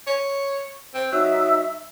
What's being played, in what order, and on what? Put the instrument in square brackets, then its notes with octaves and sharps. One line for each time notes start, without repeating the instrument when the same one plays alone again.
[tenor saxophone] C#5
C4
[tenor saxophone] F#3 [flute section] D#4 E5 E6